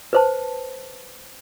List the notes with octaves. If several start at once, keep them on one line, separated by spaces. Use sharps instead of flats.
B4 C5 A5